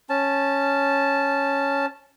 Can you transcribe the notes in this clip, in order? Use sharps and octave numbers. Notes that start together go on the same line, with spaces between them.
C#4 A5